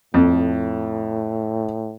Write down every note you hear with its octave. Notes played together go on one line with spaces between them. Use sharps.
F2 A2